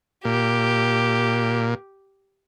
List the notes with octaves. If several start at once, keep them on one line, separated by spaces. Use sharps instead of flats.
A#2 G4